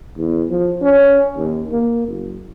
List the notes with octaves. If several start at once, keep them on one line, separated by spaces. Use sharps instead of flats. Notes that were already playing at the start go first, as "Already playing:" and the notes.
E2
F3
C#4
D#2
A#3
F#1